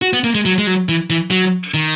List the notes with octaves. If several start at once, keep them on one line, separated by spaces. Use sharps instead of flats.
F#4
B3
A#3
G#3
F#3
G#3
F#3
E3
E3
F#3
D#3